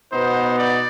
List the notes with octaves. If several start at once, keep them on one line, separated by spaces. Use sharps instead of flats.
B2 B3 D#4 C5
D5